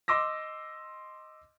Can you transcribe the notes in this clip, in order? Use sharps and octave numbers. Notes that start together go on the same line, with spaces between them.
D#5 C6 D6 E6 A#6